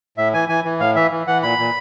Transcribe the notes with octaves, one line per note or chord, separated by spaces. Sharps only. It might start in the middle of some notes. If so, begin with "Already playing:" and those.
A2 E5
E3 G#5
E3 G#5
E3
A2 F5
E3 E5
E3
E3 F#5
A#2 B5
A#2